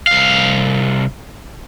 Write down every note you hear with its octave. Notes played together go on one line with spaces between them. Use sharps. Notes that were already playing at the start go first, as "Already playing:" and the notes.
C2 F5